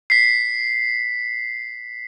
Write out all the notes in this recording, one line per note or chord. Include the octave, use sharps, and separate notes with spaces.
B6 C7